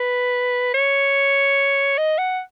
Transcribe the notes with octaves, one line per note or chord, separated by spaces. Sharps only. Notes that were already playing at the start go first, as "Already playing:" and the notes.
Already playing: B4
C#5
D#5
F#5